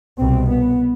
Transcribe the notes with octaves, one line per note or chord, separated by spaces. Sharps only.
C2 B2 C4
B3